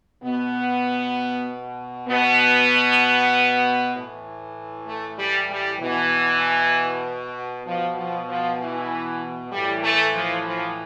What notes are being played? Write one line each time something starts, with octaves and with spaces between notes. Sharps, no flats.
B2 B3
B2 B3
A2 E3
A3
G3
G3
B2 E3
B2 F3
F3
F3
E3
A2 E3 G3
A3
F3
F3